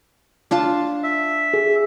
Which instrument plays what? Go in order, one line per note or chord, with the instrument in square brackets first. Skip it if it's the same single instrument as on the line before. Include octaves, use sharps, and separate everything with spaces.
[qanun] D4 F4 A5
[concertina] E5
[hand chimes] G#4